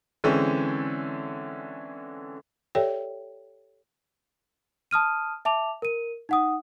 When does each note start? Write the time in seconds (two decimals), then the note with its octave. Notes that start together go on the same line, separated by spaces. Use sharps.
0.24 D3 E3 G#3 C4 C#4
2.75 G4 A4 C#5 D5 E5 G5
4.91 A5 D#6 F6 D#7
5.45 E5 A5 D6 F7
5.82 A#4 D#7
6.29 D#4 F#5 D#6